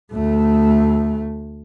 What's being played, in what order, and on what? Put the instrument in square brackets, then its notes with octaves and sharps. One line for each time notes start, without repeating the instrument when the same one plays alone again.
[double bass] D2 A3